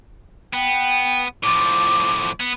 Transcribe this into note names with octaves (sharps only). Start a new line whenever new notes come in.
B3 G5
A2 F3 D6
B3